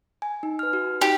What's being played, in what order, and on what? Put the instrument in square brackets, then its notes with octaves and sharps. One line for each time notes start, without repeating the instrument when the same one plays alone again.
[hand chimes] G#5
D#4
B4 F6
F#4
[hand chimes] D#4 [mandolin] G4